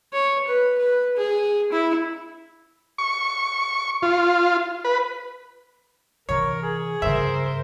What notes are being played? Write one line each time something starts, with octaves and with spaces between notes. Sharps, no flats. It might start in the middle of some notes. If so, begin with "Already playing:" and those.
C#5
B4
B4
G#4
E4
C#6
F4
B4
C3 E3 A#4 C#5
G#4
G2 C#3 A#4 C5 E5